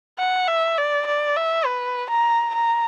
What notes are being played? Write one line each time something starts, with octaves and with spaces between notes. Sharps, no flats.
F#5
E5
D5
D5
E5
B4
A#5
A#5